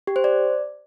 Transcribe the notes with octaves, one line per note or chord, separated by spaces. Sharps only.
G4
C5
D5